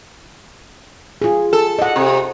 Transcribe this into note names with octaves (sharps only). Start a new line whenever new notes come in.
F4 G#4
A4
D#5 F#5
C3